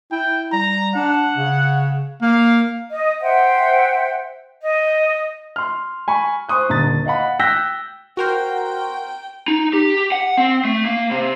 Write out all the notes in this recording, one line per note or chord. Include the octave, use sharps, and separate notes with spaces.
E4 G5
G3 A#5
D4 F#5
C#3
A#3 F5
D#5
C5 E5 F#5 G5
D#5
C6 F6
G#5 B5 C#6
C5 C6 C#6 D#6 F#6
D#1 D3 A#5 D#6 A6
D#5 F5 F#5 B5
G5 E6 F#6 G6 A#6 B6
F#4 A#4 C5 G5
D#4
G4
F#5
C4
A3
A#3
C3